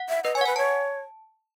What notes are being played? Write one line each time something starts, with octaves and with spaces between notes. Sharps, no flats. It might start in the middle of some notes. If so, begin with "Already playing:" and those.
Already playing: F#5
E5
B4 D#5
C#5 G#5
F#5
B4 G#5
C#5 A5